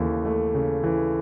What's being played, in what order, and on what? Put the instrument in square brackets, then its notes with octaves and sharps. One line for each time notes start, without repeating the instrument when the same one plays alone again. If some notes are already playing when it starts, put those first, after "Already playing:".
Already playing: [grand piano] D#2 C#3 E3 A3
A3
C#3
E3